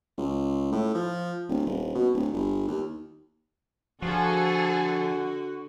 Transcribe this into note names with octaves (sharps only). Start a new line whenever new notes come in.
C#2
A2
F3
D1
D#1
B2
D1
G1
D#2
D3 F3 F#4 G#4 A4